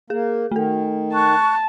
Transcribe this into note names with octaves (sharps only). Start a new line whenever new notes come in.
A#3 G#4
D#3 A3 A4
A5 C#6 F#6